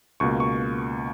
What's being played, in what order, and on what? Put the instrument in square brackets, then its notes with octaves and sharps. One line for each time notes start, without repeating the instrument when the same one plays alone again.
[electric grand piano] C#2 B2 A#3 C#6
C#6